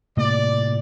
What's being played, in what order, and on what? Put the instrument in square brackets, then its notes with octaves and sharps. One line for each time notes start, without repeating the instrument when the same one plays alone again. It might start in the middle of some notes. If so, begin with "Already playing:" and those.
[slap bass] A2 C3 A#3 [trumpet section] D5